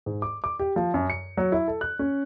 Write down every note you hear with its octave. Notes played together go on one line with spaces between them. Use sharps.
G#2
D6
D6
G4
F3
F#2
C#7
F#3
E4
A4
F#6
C#4